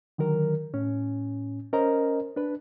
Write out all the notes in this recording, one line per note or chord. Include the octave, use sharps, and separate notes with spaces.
D3 D#3 F#3 A#4
A2 C#4
C#4 A#4 C5 D#5 A#5
D4 B4